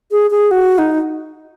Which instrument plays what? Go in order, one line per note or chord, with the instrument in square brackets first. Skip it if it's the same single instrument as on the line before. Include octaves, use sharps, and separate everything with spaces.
[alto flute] G#4
G#4
F#4
D#4